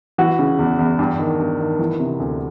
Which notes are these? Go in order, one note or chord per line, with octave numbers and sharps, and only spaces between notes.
E3 F#4
C#3
E2
E2
G2
D#3
G2
D#3
E3
C3
D2